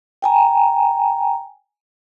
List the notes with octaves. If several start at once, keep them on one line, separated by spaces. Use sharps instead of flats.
G5 G#5 A#5